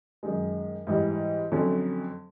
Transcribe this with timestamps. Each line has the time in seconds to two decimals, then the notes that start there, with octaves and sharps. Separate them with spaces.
0.23 F#2 D#3 G#3
0.87 G#2 E3 G3
1.52 F2 D3 F#3 A3 C#4